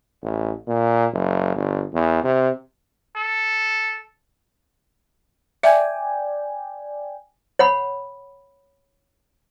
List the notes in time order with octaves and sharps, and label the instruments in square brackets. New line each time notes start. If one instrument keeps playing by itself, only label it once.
[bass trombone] A1
A#2
F#1
G1
E2
C3
[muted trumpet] A4
[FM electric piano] D5 G5 G#5 [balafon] E5
[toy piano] C#5 F#5 B5